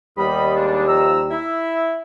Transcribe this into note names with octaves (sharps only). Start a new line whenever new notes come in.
D#2 G3 B3 D#5 B5
G#3 D4
F3 A#5 E6
E4 E5